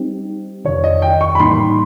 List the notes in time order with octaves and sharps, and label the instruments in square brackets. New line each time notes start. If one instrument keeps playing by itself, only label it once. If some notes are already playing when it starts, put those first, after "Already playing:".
Already playing: [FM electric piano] G3 C4 D#4 G4
[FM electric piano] F2 C3 D#3 [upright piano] C#5
[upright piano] D#5
G5
C#6
B5
[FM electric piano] A2 E3 G3 A#3 D#4 [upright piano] C6